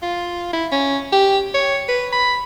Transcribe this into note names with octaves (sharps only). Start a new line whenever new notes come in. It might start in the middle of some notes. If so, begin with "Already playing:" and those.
F4
E4
C#4
G4
C#5
B4
B5